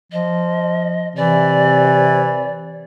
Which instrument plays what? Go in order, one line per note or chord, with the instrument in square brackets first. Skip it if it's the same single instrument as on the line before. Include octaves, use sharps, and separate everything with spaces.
[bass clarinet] F3 [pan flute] D#5
[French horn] C3 [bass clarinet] E3 [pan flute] D5